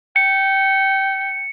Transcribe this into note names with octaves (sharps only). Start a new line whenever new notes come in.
G5 C#7